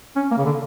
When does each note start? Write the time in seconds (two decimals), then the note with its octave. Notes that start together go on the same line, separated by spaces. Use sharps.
0.16 C#4
0.31 A#3
0.38 C#3
0.46 D3